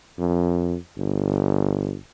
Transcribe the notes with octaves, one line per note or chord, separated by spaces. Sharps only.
F2
G1